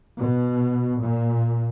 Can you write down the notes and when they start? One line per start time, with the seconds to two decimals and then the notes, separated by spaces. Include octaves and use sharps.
0.19 B2
1.01 A#2